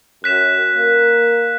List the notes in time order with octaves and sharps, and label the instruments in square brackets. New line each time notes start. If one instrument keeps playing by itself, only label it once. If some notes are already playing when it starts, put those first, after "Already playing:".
[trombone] F#2 [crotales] F#6 B6 E7
[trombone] A#3